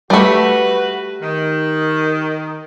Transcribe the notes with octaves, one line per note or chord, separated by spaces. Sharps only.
G3 A3 F#4 B4
D#3